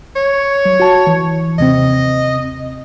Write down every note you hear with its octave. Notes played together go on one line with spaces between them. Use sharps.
C#5
F#3
F#4 A5
E3
D#2 C3 C4 D#5